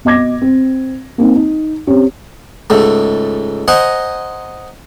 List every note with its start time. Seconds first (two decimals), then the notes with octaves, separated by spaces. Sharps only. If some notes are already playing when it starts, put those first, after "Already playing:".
0.05 B2 D#5 D6 G#6 A#6
0.42 C4
1.18 A#3 C4 D#4
1.35 D#4
1.87 C4 C#4 G4 C#5
2.70 C#2 G#2 A3
3.68 C5 D#5 F#5 G#5 A#5